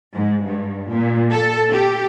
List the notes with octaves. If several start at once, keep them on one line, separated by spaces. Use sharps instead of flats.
G#2
G2
A#2
A4
G4